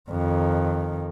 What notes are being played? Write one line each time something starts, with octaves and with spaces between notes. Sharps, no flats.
F2 D#3